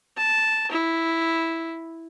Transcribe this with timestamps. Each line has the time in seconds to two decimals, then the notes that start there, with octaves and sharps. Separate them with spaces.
0.17 A5
0.71 E4